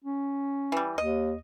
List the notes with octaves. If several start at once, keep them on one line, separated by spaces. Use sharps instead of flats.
C#4
E3 G3
D#2 D#5